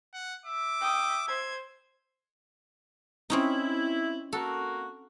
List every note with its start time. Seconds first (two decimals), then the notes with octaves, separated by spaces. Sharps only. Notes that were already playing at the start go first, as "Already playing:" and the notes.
0.14 F#5
0.46 E5 D6
0.81 G5 D#6
1.28 C5 G#6
3.30 C4 C#4 D#4 E4
4.33 A#3 F#4 A4